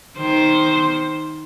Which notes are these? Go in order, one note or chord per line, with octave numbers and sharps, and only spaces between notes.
D#3 C5